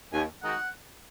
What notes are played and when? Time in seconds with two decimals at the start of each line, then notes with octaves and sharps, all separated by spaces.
0.12 D#2 G#5
0.42 D#3 G#3 D#4 F#4 F#5